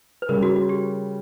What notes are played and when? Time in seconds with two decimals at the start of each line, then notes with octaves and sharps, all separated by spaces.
0.22 B4
0.29 C#3 G3 C#4 A#4
0.43 F#4
0.56 F#4
0.69 G4